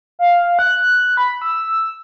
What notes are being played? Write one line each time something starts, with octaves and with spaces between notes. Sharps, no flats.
F5
F#6
B5
E6